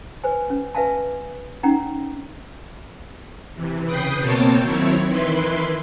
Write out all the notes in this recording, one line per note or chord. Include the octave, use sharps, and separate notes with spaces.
B4 C5 G#5
C#4
B4 E5 F5 G#5 A5
C#4 D#4 F#5 G5 A#5
C3 E3
C#3 B4 G5 D#6 G6 C7
B2 A#3 C4 C#5 G5 A5
D#3 F#3 C4 E4 C#5
D#3 E3 E4 B4 C6